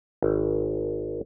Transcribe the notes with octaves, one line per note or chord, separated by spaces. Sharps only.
G#1